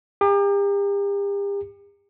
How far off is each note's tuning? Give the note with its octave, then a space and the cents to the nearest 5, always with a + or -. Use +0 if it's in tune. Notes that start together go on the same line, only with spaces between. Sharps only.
G4 +40 A#5 -25